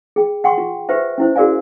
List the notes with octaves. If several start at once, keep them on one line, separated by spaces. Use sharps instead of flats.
G#4 G5
F#5 G5 C6 C#6
F4
G4 B4 C5 E5
C#4 E4 C5
F#4 G#4 A#4 D5 F5 G#5